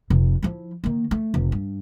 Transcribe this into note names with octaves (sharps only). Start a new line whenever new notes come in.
F1 C3
F3 E4
D#3 A#3
A3
F1
G2